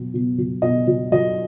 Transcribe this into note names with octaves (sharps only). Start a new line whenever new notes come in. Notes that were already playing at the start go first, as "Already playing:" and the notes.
Already playing: B2 F#3
B2
F#3
B2 D#5
F#3
F#3 D#5